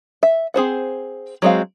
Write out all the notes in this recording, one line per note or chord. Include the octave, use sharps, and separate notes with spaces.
E5
C4 G#4 C5 F#5
F#3 G#3 C4 F5